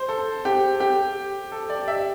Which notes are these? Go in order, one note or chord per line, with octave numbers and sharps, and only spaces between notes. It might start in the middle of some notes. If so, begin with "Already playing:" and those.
Already playing: C5
A4
G4
G4
A4
D5
E5